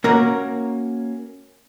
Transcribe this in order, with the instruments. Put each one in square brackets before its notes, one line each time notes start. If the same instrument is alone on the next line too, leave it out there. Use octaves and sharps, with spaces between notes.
[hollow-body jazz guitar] A#3 C#4 F#4 A#4 C#5